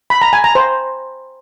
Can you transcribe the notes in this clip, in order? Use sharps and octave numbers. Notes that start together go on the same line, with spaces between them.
B5
A#5
G#5
A#5
C5